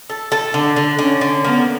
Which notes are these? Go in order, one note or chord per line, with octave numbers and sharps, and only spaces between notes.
A4
A4
D3 D4
D3
D3 C#4
D3
A#3 B3